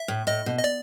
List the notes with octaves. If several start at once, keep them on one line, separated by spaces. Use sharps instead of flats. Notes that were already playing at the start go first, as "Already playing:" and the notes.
Already playing: E5
A2
A2 D#5
B2
D#5
D5